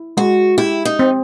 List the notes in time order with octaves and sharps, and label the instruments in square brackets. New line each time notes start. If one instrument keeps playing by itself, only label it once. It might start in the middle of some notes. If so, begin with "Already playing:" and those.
Already playing: [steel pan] E4
[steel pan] G#3 [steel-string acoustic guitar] F#4
[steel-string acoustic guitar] E4 [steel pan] G4
[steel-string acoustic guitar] D#4
[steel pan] C4